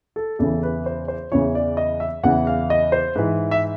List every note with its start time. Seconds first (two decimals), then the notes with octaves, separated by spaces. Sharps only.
0.16 A4
0.39 E2 C#3 E3 A4
0.63 B4
0.86 C5
1.08 C5
1.32 E2 C#3 E3 C#5
1.55 D5
1.77 D#5
2.00 E5
2.23 E2 C#3 E3 F#5
2.47 F5
2.70 D#5
2.92 C5
3.15 G#2 E3 B4
3.51 E5